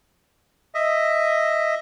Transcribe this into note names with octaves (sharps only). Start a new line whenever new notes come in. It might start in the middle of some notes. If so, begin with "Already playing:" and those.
D#5 E5